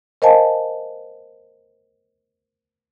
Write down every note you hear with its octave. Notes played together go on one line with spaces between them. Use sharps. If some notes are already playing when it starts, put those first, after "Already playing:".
A#4 C5 D#5 F5 G#5 A5